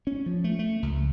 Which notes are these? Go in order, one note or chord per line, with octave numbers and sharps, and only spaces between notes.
C#4
F3
A3
A3
C#2